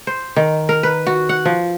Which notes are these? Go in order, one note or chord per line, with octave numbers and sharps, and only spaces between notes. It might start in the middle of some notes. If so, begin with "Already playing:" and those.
C5
D#3
A#4
B4
F#4
F#5
F3